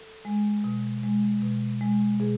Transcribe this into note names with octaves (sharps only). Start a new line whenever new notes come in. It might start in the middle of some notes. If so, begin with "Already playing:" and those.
Already playing: A4
G#3
B2
G#3
B2
G#3
B2 G#4